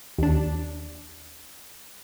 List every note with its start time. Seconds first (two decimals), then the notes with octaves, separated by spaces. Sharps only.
0.18 D#2 D4